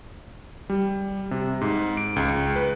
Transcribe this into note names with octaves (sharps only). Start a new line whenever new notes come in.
G3
C3
G#2
D7
C#2
B4